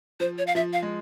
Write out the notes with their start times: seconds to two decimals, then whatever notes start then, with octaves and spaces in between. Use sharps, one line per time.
0.20 F3 C5
0.38 C#5
0.47 F5
0.55 F3 E5
0.73 F5
0.83 G#3